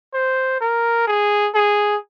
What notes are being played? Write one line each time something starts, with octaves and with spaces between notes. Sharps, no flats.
C5
A#4
G#4
G#4